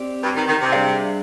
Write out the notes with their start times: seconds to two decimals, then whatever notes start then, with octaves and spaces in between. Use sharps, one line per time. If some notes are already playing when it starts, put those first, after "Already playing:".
Already playing: C4 G4 D5
0.23 G2
0.35 D#3
0.47 D#3
0.60 C3
0.72 G3 D4 G#4 D5 F5